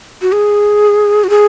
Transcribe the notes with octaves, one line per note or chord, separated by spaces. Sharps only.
F#4
G#4
F#4
G#4